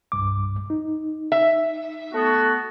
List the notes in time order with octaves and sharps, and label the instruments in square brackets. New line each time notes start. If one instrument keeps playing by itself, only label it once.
[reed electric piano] C2 G2 D6
D#4
[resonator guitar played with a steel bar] E5
[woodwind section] A3 B3 F#4